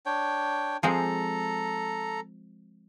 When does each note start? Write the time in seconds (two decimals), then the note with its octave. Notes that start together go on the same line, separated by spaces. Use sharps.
0.06 D4 C#5 G5
0.83 F3 G#3 C4 A4 A#5